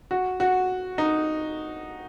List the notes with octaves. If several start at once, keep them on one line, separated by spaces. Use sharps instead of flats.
F#4
F#4
D#4